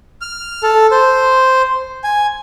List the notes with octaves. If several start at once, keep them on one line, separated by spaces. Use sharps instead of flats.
F6
A4
C5
G#5